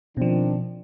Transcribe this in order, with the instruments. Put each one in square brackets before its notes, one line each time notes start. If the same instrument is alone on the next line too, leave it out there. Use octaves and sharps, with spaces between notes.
[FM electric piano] B2 F3 [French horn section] D#3 C4 D4